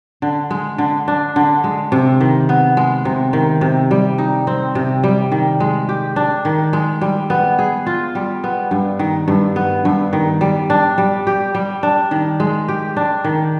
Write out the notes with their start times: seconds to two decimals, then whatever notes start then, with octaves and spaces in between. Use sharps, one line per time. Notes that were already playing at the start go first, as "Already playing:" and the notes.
0.22 D3
0.51 G#3
0.78 D3
1.08 D4
1.36 D3
1.64 G#3
1.92 C3
2.20 D#3
2.49 B3
2.77 G#3
3.05 C3
3.33 D#3
3.61 C3
3.91 G3
4.18 D#4
4.47 C4
4.75 C3
5.04 G3
5.32 D#3
5.60 G#3
5.89 G4
6.16 D4
6.45 D#3
6.73 G#3
7.01 G3
7.30 B3
7.59 G#4
7.86 F4
8.15 G3
8.44 B3
8.71 G2
8.99 D#3
9.28 G2
9.56 B3
9.85 G2
10.13 D#3
10.41 G3
10.70 D4
10.98 G3
11.27 G4
11.55 G3
11.83 D4
12.11 D#3
12.40 G#3
12.68 G4
12.97 D4
13.24 D#3